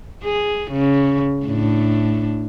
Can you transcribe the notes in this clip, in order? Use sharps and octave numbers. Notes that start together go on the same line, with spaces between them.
G#4
C#3
A2 D4